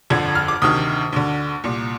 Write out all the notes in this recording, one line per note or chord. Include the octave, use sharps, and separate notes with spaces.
G1 F2 D3 G#6
F6
D6
D2 C3 D#3 D#6
D2 D3
C2 A#2